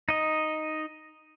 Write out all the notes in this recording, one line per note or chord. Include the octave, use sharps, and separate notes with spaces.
D#4 D#5